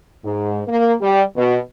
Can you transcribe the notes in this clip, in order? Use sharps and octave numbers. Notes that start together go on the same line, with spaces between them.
G#2
A#3
G3
B2